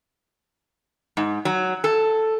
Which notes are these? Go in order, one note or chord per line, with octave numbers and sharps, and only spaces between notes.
G#2
F#3
A4